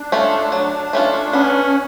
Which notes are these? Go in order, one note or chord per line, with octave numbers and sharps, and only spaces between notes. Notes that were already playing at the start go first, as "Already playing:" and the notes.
Already playing: D4
A3 C#4 F4
F#3
A3 C#4 F4
B3 C#4